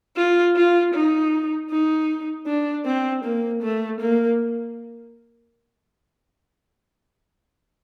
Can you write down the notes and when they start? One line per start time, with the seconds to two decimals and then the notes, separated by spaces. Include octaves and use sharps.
0.16 F4
0.55 F4
0.94 D#4
1.70 D#4
2.46 D4
2.86 C4
3.24 A#3
3.63 A3
4.00 A#3